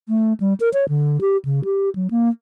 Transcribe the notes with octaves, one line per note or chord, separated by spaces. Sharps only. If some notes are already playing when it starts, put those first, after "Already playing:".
A3
G3
A#4
C#5
D3
G4
C#3
G4
F#3
A#3